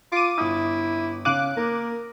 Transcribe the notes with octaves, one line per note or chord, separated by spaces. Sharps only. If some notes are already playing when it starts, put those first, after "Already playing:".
F4 D6 D#7
G1 E4 D#6
C#3 F5 D6 F#6 D#7
A#3 A#4